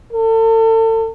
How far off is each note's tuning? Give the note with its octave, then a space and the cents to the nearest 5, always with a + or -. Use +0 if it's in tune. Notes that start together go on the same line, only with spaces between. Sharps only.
A4 +35